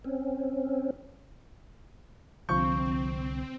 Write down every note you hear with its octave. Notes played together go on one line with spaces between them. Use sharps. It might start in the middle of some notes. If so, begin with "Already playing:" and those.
C4 C#4
C2 D3 F3 G3 C4 C#6 G6